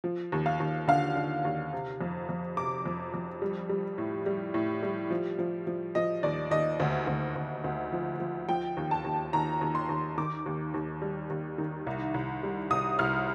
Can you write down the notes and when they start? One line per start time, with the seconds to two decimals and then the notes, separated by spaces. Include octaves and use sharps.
0.04 F3
0.32 D#2
0.46 F5
0.60 D#2
0.88 D3 F5
1.16 D3
1.45 D#2
1.73 C3
2.01 F2
2.29 F2
2.57 C3 D6
2.86 F2
3.14 F2
3.42 G3
3.69 G3
3.98 A2
4.26 G3
4.54 A2
4.83 G3
5.11 F3
5.39 F3
5.67 F3
5.95 F3 D#5
6.23 D#2 D5
6.51 D#2 D#5
6.80 D2
7.07 D2
7.35 D2
7.64 D2
7.92 F3
8.20 F3
8.49 F3 G5
8.77 D#2
8.91 A5
9.04 D#2
9.33 D#2 A#5
9.61 D#2
9.75 C6
9.89 D#2
10.18 D#3 D6
10.46 D#2
10.74 D#2
11.02 G3
11.30 D#2
11.58 D#3
11.87 C2
12.14 C2
12.43 G3
12.70 C2 D#6
12.99 C2 F6